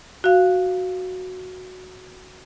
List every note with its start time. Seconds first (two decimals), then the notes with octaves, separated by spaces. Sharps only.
0.24 F#4 F5